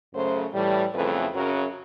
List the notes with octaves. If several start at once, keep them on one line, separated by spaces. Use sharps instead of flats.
F#2 C#3 F#3 A3 C5
A2 E3 G3
F2 C#3 E3 A3 B4
F#2 C#3 F#3 A#4